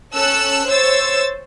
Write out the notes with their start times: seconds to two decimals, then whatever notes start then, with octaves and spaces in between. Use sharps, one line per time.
0.14 C#4 A4 E6 F#6
0.67 C5 C#5 E6 A6